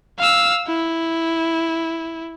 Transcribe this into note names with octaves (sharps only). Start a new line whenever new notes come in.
F5 E6
E4